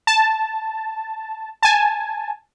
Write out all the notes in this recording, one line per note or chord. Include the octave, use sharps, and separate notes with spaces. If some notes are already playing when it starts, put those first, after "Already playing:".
A5
G#5 A5